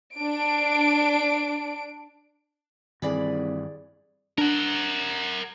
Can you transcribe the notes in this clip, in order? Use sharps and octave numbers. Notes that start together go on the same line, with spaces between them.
D4 D7
C2 G2 D#3 E3 G#4 D5 B5
D4 A#4 F#5